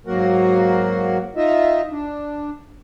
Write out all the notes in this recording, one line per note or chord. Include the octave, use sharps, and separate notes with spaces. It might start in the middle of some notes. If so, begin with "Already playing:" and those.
G#2 F#3 A#3 F#4 A#4 F#5
D#4 F4 D#5 E5
D4